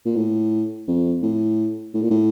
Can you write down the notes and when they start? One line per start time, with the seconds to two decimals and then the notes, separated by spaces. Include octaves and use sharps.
0.05 A#2
0.16 A2
0.87 F2
1.22 A2
1.94 A2
2.02 A#2
2.10 A2